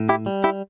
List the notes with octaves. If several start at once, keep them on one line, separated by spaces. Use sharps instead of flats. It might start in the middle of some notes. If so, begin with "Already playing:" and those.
Already playing: A2
E4 G4
G3
E4 G4